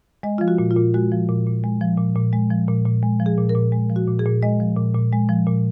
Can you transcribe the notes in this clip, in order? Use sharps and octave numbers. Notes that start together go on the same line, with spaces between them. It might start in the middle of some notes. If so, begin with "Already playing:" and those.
G#3 D#5
F3 F4
F#4
A#2
F4
A#2
G#3 F#4
F3
A#2
A#2
G#3
F3
A#2
A#2
G#3
F3
A#2
A#2
G#3
F3
G#4
A#2
A#4
A#2
G#3
F3
F#4
A#2
G#4
A#2
G#3 D#5
F3
A#2
A#2
G#3
F3
A#2